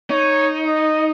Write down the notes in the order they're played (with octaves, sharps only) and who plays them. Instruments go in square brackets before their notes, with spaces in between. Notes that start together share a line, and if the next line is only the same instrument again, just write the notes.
[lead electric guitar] D#4 [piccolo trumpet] C#5
[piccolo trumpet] D#5